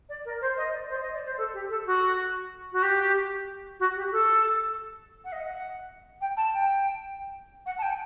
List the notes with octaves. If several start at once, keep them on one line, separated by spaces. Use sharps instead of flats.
D5
A#4
C5
D#5
D5
C5
D#5
D5
C5
A4
G4
A4
F#4
F#4
G4
F#4
G4
A4
F#5
D#5
F#5
G5
A5
G5
F#5
A5
G5